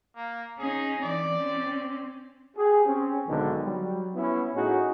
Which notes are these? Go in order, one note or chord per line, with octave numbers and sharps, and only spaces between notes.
A#3
C#4 D#4 G#4
E3 C4 D5
C4 C#4
G4 G#4
C4 C#4
B1 G#2 D3 D#3 B3
F#3 G3
B3 C#4 E4
A2 C#4 D#4 F#4 G#4